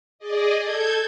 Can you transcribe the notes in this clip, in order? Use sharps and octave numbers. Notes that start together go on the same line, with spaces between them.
G#4 D5 D#5
A4 G6 G#6